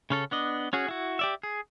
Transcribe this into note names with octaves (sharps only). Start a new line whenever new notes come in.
C#3 C#4 A4
B3 D4 D#5
C#4 F#4 G#4
E4 F#4
G4 D5 E5
G#4